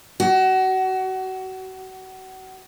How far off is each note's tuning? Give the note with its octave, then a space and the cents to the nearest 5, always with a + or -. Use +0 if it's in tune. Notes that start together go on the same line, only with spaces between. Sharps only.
F#4 +30